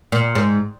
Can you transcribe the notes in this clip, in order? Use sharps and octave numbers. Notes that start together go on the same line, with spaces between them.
A#2
G#2